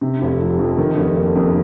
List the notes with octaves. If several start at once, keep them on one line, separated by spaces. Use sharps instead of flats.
C3
F1
F3
F2
D#3
F1
A#3
F2